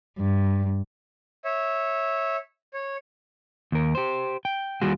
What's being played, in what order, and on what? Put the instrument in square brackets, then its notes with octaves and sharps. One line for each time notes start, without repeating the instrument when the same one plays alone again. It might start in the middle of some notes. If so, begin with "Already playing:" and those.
[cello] G2
[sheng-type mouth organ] C#5 E5
C#5
[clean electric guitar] D#2 A#4
G4 C5
G5
D#2 G3 F4 F#4 G#4